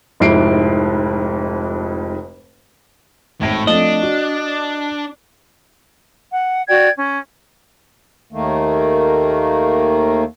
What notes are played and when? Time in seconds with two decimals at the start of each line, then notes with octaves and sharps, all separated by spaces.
0.20 F1 F2 G#2 E4 C7 D7
3.41 G#1 A2 A#6
3.67 F3 A3 C4 D4 D#5
4.02 F#4
6.32 F#5
6.69 F#4 D5 G5 G#6
6.97 C#4
8.33 D#2 D#3 A3 A#3